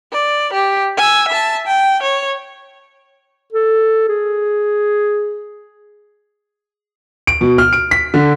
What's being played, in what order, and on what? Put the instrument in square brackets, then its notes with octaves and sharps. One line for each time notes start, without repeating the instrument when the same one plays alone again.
[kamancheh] D5
G4
G#5 E6
E5 A5
G5
C#5
[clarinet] A4
G#4
[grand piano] D7
B2
F6
D7
B6
D3